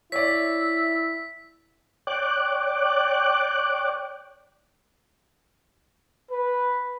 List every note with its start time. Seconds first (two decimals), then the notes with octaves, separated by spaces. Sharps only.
0.12 E4 C#5 D5 E6 B6
2.07 C#5 D5 G5 D6 F#6
6.31 B4